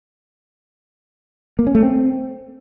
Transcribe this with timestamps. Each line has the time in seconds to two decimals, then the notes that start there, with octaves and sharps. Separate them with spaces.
1.59 A#3
1.67 C#4
1.75 A3
1.83 C4